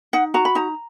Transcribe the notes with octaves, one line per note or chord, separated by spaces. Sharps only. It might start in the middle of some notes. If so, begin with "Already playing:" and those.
D#4 F#5
F#4 A#5
B5
D#4 A#5